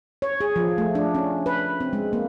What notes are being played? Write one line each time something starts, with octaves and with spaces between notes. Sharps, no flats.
C#5
G#4
F3
A3
D4
C#4
B4
C4
G#3
A#3